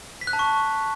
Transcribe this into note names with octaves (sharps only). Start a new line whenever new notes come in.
B6
F#6
A5
C#6